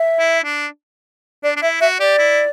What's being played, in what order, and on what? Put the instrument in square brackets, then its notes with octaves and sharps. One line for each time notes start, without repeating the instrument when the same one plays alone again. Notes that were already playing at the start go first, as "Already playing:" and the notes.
Already playing: [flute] E5
[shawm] E4
D4
[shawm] D4 [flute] D5
[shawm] D4
[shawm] E4 [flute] E5
[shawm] F#4 [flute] E5
[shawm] G4 [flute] D5
[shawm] E4